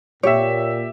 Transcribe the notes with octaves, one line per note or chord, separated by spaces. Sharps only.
A#2 G4 C#5 E5